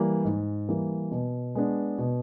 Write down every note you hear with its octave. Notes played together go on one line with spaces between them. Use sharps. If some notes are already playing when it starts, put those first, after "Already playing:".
Already playing: E3 G3 A#3
G#2
E3 G3 A#3
B2
G#3 B3 D4
B2